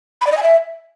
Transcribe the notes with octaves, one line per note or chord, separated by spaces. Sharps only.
B5
D5
D#5
G#5
E5